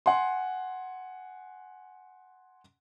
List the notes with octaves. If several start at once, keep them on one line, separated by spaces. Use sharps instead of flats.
F#5 G#5 C6